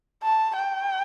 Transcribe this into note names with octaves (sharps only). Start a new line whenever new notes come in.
A5
G5